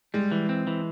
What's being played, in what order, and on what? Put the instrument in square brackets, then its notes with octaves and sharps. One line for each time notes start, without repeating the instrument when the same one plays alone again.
[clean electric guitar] G3 [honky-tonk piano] G#3
[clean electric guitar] E3
C4
E3